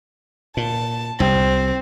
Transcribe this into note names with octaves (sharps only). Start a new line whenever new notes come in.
A#2 A5
C2 C4